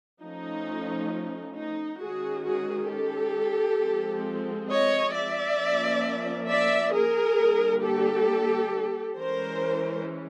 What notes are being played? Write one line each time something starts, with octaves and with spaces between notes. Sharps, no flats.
F3 A3 C#4 D#4
D#4
D#3 G#3 C#4 F#4 G#4
F#4 G#4
G4 A4
F3 G#3 C4
C#5 D#5
D5 E5
F3 A#3 C#4
D5 E5
G#4 A#4
D3 G3 A#3
G4 A4
E3 G#3 C#4 A#4 C5